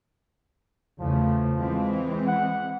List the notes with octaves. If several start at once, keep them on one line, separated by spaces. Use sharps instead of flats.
E2 C#3 F3 A3
E3 G#3 C4
F#5